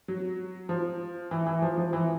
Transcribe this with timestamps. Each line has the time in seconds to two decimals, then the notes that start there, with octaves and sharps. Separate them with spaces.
0.08 F#3
0.69 F3
1.31 E3
1.46 E3
1.62 F3
1.77 F3
1.93 E3